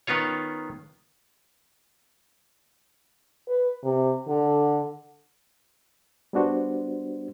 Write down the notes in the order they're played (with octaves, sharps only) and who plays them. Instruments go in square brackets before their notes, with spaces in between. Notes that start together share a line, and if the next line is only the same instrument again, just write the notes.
[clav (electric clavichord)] D#3 B3 C#4 F4 C#5
[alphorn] B4
C3
D3
[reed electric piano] G3 B3 D4 F#4 C5